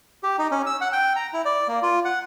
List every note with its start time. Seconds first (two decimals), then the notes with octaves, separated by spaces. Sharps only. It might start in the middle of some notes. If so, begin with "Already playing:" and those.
0.23 G4
0.39 D#4
0.51 C#4
0.66 E6
0.81 F#5
0.93 G5
1.16 A#5
1.33 E4
1.45 D5
1.68 A#3
1.83 F4
2.05 F#5